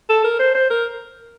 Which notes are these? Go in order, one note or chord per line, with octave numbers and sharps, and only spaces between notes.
A4
A#4
C5
C5
A#4